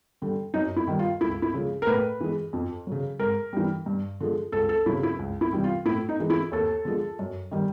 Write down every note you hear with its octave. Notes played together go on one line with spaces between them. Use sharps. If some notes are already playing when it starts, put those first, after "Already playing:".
D3 G3
F#2 D#4
E4
D#3 G3
F4
C#2 E4
E4
C#3 F3 G#3
A#4
A2 B4
E3 G#3
F2
C#3 F#3
G#2 A#4
E3 G3
G2
D3 F3 G#3
C#2 A4
A4
C#3 F#3 E4
E4
C#2
E4
C3 E3 G3
F4
A2 E4
D#4
E3 G#3
E4
D#2 A4
D3 F3 G#3
F#2
D#3 G3